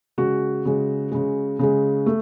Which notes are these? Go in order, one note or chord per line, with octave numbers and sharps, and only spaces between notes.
C#3 G#3 F#4
C#3 G#3
C#3 G#3
C#3 G#3
A3